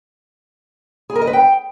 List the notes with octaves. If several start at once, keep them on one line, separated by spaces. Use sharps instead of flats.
G#4
A#4
D#5
B4
G5